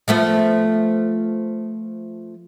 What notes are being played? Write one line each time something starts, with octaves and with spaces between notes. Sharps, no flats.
F3 A3 B3